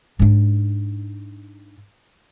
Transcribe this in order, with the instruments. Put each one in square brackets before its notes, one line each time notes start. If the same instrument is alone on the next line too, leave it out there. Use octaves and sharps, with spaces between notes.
[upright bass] G#2 D4